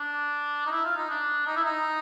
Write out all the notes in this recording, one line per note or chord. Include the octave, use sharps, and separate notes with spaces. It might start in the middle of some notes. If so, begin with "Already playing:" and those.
Already playing: D4
D#4
E4
F4
D#4
D4
D#4
E4
D#4